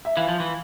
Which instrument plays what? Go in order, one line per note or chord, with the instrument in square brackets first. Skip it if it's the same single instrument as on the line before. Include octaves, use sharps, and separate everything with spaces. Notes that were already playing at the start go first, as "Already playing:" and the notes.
[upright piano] E5
[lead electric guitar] E3 [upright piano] F5
[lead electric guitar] F3
E3